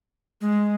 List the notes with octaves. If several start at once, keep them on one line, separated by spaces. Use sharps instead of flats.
G#3